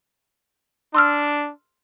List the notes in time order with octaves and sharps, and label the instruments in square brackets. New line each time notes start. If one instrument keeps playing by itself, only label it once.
[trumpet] D4 [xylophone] C6 E6 F6